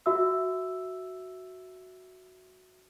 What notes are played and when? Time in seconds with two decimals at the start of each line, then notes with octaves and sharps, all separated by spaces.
0.06 F#4 E5 E6